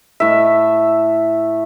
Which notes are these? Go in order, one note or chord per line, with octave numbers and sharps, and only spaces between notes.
A2 E5